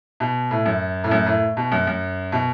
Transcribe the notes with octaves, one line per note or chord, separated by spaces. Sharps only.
B2
A2
F#2
A2
F#2
A2
B2
F#2
F#2
B2